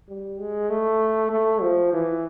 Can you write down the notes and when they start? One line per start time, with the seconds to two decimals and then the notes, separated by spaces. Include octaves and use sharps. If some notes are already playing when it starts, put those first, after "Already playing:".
0.09 G3
0.39 G#3
0.70 A3
1.31 A3
1.61 F3
1.93 E3